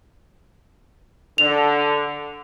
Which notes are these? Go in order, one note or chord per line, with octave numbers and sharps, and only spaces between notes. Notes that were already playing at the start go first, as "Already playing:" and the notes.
D3 F7